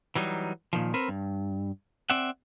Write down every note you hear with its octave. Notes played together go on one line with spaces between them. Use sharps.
E3 F#3 G3 D#4
A#2 D#3 F3
C4 A#4 B4
G2
C4 D5 E5 F#5